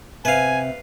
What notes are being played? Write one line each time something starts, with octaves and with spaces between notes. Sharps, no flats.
C3 B4 F5 G#5